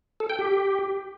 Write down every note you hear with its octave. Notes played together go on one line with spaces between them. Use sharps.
A4
G5
G4